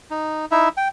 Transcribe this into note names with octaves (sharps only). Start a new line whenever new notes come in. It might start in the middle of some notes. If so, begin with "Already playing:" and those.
D#4
D#4 E4 E5
G5